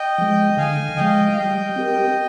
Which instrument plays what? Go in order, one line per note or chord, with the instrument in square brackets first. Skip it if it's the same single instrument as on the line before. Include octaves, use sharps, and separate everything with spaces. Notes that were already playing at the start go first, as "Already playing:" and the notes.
Already playing: [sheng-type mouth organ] D#5 G5
[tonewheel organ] F3 G#3
[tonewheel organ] D3 [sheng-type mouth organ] F5 G#5
[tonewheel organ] F3 G#3 [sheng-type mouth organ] D#5 G5
[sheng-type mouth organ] F5
[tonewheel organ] G3 [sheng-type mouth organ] D#5 G5
[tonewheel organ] C4 G4 A#4